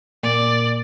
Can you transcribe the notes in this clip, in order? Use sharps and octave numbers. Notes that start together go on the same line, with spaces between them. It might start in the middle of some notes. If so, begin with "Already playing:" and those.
A#2 D5